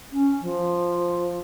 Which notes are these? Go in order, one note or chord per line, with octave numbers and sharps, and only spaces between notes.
C#4
F3